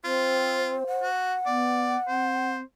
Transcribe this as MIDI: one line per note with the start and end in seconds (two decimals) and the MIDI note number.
0.05 0.84 60
0.05 0.75 65
0.05 1.08 72
0.87 2.52 78
1.02 1.34 66
1.46 1.96 59
1.46 1.97 74
2.08 2.62 60
2.08 2.61 72